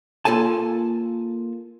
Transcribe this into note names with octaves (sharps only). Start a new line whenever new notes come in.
A#3 F4 A4 G#5 A5